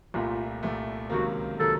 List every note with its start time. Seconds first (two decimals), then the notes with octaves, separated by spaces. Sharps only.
0.14 C2 A#2 A3 F4
0.63 C2 A#2 A3
1.10 C#2 C3 D#3 F#3 A#3 F#4
1.58 C3 D#3 F#3 A#3 A4